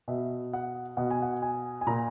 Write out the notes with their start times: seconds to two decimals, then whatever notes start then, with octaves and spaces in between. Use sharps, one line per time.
0.08 B2 E5
0.53 F#5
0.97 B2 F#5
1.10 G#5
1.22 F#5
1.42 G#5
1.81 G#5
1.87 A#2 A#5